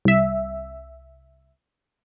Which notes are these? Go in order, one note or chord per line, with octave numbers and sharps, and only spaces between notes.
C2 E5